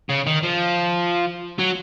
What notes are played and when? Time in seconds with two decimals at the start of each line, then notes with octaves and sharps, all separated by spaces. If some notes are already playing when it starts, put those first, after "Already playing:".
0.10 C#3
0.27 D#3
0.43 F3
1.59 F#3